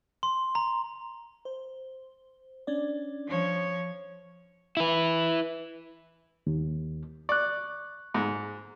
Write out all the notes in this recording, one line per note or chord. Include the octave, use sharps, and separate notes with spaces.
C6
A#5
C5
C#4 D4 D5
F3 C#5
E4 B4
D#2
D5 C#6 F#6
G#2